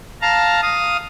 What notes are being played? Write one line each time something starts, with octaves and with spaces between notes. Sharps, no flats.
F5 A5 A#5
F5 D#6